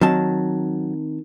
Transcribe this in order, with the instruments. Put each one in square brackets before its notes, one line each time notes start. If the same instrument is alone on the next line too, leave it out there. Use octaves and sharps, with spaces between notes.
[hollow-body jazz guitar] D#3 C4 A5 [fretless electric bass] F#3